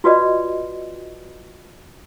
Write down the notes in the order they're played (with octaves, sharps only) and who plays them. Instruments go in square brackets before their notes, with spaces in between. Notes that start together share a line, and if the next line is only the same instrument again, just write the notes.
[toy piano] F4 F#4 B4 D5 D#5